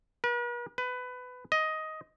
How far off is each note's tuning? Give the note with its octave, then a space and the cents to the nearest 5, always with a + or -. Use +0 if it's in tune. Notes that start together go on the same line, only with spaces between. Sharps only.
B4 -45
B4 +20
D#5 +10